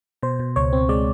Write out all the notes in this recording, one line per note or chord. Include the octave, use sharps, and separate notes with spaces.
B2 C5
B2
C#2 C#5
C4
G#3 D5